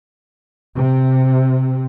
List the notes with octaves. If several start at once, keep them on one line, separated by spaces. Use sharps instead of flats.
C3